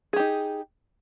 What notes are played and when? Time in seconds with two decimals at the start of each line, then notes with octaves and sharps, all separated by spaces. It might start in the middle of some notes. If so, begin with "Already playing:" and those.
0.13 G#4
0.16 G4
0.20 D#4